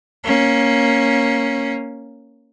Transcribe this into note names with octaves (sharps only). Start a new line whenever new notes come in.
A#3 C#4